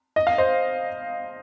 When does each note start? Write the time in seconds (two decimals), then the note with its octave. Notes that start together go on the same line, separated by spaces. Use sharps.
0.16 D#5
0.27 F5
0.38 C5 D#5